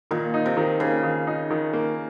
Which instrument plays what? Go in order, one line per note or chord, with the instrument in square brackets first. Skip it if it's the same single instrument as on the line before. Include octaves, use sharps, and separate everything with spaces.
[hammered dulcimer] A#2 [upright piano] D#3
[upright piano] D#4
[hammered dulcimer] C3
[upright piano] D#3
[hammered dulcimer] C#3 [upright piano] A#3
[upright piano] D#3
D#4
D#3
A#3